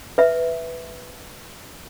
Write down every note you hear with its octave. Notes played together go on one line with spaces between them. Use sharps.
B4 E5